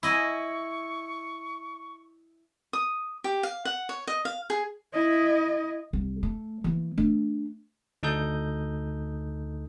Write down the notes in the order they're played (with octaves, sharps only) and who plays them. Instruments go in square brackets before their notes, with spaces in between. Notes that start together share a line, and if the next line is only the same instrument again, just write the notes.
[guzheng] E4 D#5 G#5 [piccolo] C#6
[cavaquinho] D#6
G4
F5
F#5
C#5
D#5
F5
G#4
[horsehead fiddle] E4 D#5
[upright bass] C2
A3
E3 A#3
A3 D4
[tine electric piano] D2 D#4 A4 D#6 G6